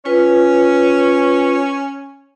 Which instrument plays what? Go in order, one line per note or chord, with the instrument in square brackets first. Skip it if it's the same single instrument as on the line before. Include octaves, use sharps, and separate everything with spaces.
[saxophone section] C#4 [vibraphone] F4 B4